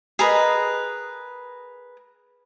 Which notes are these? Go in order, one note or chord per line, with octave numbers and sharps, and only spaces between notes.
G#4 A#4 B4 D#5